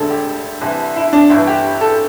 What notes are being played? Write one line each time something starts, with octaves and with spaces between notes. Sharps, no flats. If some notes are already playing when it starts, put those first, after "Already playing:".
Already playing: E1 D2 D3 A4
G4
C2 C3 E3
E4
D4
G1 G2 E3 E4
G4
A4